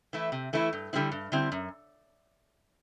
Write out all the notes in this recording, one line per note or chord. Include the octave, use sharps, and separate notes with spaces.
E3 A3 E4
C3
E3 A3 E4
G2
D3 G3 C4 E4
G2
D3 G3 C4 E4
F#2